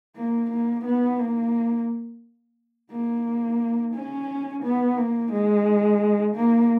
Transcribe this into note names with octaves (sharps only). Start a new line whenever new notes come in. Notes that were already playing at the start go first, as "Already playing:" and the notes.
A#3
A#3
B3
A#3
A#3
C#4
B3
A#3
G#3
A#3